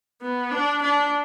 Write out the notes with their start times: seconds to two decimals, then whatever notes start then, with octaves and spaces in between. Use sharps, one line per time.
0.21 B3
0.51 D4
0.82 D4